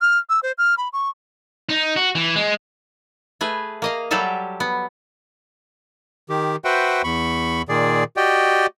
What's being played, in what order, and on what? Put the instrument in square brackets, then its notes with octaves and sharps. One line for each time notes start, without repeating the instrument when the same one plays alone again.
[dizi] F6
E6
C5
F6
B5
C#6
[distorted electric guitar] D#4
F#4
E3
G#3
[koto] A3 G#4 B4
A#3 D#5 F5
F#3 G3 G4 A4 E5 F5
B3
[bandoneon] D#3 G4
F#4 B4 C5 E5 F#5 G5
E2 B5 C#6
A#2 D#3 G#4 D5
F#4 G4 D5 D#5 G5